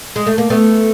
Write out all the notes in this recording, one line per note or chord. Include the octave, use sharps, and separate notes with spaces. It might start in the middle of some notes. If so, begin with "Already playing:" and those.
G#3
A3
A#3
A3 B3